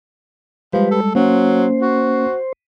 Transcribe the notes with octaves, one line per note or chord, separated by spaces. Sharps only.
F3 G3 G#3 G4 B4
A4
F#3 A#3 C#4 C5
F#4